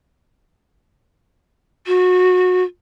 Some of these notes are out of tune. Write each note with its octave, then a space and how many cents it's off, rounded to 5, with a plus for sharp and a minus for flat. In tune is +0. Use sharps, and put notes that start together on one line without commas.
F#4 -25